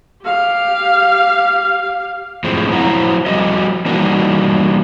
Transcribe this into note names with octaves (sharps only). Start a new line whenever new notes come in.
G4 F5
F#2 A2 F3 G#3 C4
F3 F#3 E4 C5 F#5 A#5
F3 G3 F#4 D#5
E3 G3 A#3 D4 D#4 F#4